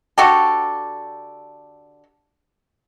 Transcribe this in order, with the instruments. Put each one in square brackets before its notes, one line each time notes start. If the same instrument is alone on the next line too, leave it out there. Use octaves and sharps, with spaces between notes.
[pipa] D3 F#4 G4 A4